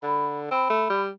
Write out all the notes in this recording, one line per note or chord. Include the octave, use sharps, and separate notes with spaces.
D3 B5
C4 B5
A3
G3